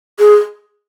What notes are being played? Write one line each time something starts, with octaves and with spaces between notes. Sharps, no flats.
G#4